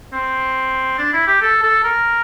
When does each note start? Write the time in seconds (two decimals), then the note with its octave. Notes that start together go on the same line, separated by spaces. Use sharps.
0.13 C4
0.98 D4
1.13 E4
1.27 G4
1.41 A4
1.63 A4
1.84 A#4